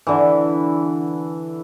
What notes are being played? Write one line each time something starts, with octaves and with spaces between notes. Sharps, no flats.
D3 E3